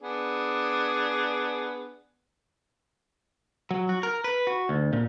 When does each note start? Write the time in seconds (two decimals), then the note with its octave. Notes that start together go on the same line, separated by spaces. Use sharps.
0.02 B3 D4 G#4
3.71 F#3
3.89 F#4
4.03 A#4
4.24 B4
4.47 F#4
4.69 D2
4.93 A#2